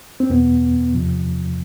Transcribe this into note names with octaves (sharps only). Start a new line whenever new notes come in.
C4
E2 B2 B3
E2 C3 F3